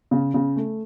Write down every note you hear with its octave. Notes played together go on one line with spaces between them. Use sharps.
C#3
C#3
A3